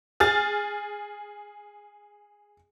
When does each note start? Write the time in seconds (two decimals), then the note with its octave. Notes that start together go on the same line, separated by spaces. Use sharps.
0.20 G#4 F6 A6